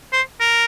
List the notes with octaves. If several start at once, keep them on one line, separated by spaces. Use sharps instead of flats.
C5
A#4